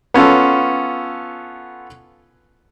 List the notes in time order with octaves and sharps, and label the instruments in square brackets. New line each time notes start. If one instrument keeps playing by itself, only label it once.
[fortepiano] B3 C#4 F4 A4